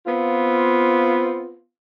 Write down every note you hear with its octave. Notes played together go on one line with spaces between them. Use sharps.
B3 C4 F4